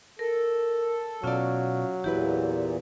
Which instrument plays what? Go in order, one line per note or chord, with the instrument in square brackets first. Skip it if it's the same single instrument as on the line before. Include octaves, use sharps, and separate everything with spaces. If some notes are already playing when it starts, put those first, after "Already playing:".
[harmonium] A4 [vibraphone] A#4
[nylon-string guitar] B2 D5 [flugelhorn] F#3 [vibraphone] C#4 F4 F5
[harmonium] E2 A#2 [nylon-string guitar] E3 E4 B4 [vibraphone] G4